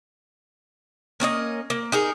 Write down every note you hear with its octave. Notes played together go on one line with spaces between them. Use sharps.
A#3 C#4 D4 D#5
A#3
D#4 G#4 A#4